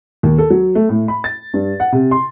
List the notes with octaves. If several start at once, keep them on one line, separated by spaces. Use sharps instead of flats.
D#2
A4
F#3
A3
A2
B5
A6
G2
F#5
C3
C6